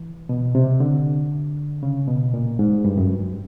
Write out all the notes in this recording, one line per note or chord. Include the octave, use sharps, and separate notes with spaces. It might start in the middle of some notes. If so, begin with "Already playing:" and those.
Already playing: E3
B2
C3
D3
C#3
B2
A#2
G#2
G2
F#2
G2